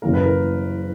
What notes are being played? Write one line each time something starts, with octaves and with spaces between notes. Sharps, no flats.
F#1 F#2 E3 A#3 A#4
B4
A#4